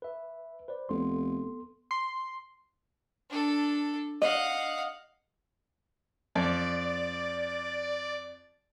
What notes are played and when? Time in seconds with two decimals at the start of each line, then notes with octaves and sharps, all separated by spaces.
0.02 B4 E5
0.68 B4 C5 D5
0.89 F1 B3 A4 C6
1.91 C6
3.30 D4 A4
4.22 D#5 F5 F#5
6.35 F2 D5